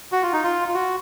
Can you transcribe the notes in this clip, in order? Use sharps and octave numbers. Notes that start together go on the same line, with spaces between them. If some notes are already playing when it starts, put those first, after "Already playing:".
F#4
F4
D#4
F4
F4
F#4